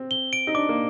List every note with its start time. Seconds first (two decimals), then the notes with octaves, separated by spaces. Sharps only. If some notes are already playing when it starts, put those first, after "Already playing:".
Already playing: C4
0.11 G7
0.33 D7
0.47 D#4
0.54 D4 D6
0.69 A#3